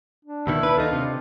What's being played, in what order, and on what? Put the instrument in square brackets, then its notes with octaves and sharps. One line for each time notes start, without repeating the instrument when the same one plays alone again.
[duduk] D4
[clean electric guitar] D#2 B2 D#3 [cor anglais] E4
[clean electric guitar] B4
[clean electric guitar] D#2 D#4 [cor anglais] F4 [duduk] A4
[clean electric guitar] C3 [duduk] D4